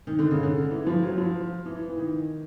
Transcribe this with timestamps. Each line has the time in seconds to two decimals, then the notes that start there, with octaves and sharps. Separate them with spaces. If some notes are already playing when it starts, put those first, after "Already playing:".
0.07 D#3
0.19 D3
0.31 C#3
0.43 D3
0.71 E3
0.87 F3
1.02 F#3
1.18 F3
1.66 E3
1.89 E3
1.97 D#3